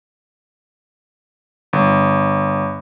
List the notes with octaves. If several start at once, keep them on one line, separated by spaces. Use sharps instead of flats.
G1